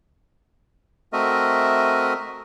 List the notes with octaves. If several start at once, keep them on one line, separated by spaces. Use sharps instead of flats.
A3 C4 F#4 A#4 D#5 E5